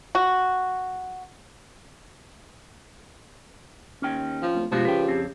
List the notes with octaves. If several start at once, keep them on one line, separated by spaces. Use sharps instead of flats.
F#4
D#2 C#4 G5
F3
D1
G1 B2 F3 G#3 F#4 G4
C#3 B4 G5
F2 C4